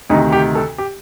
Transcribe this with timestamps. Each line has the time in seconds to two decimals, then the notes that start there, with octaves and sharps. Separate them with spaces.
0.10 D2 C3 D#3 D#4
0.32 G4
0.55 A4
0.78 G4